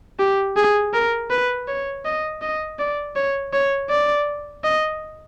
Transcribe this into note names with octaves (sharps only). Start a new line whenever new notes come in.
G4
G#4
A#4
B4
C#5
D#5
D#5
D5
C#5
C#5
D5
D#5